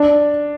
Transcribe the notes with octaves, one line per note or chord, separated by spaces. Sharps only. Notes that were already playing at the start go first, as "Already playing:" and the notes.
Already playing: D4